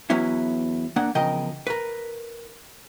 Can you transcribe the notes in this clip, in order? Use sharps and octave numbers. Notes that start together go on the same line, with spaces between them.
E2 F#3 B3 C#4 E4
A#3 D4 F#5
E2 C#3 F3 A#4 D#5 G5
A#4 B4